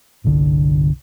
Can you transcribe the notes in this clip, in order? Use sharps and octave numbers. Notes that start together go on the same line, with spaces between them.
G1 C2 D3